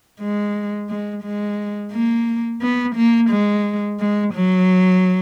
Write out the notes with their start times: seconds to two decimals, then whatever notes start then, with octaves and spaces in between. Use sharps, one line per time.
0.20 G#3
0.89 G#3
1.23 G#3
1.92 A#3
2.61 B3
2.95 A#3
3.30 G#3
3.99 G#3
4.34 F#3